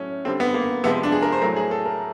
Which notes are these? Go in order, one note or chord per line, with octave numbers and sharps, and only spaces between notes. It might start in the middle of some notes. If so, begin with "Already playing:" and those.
Already playing: A2 F#3 A3 C#4
D3 G3 C4
B3
A#3
C3 F3 G#3 B3
D4
G#4
A#4
C5
A2 F#3 A3 A#4
G#4
A4
A#4